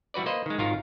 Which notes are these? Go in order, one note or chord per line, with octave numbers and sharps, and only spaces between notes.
E3 G3 F#4 B4 D5
A#3 B4 C5 D#5
D#3 G#3
G#1 D#3 F4 F#4 A#4